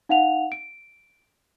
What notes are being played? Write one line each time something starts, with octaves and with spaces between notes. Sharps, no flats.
D#4 F5 F#5 F7
D7